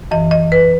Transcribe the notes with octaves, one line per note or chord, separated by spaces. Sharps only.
F#2 E3 D#5
D#5
B4